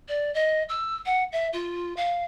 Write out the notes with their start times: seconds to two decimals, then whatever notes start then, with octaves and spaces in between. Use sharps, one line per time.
0.08 D5
0.34 D#5
0.69 E6
1.06 F#5
1.32 E5
1.53 F4
1.97 F5